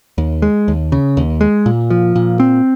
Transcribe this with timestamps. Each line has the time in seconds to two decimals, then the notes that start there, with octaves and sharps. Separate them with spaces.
0.18 D#2
0.42 G#3
0.68 D#2
0.92 C#3
1.17 D#2
1.41 G#3
1.66 A#2
1.90 F3
2.16 A#2
2.40 C4